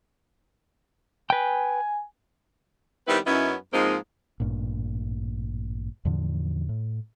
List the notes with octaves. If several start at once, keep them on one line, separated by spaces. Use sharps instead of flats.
B4 G5 G#5
D#3 G3 B3 C4 E4 B4
F#2 B3 C#4 D#4 E4
G#2 F3 G#3 A#3 C4 D#4
A1 G2 A#2
E2 A2 D3 F3
A2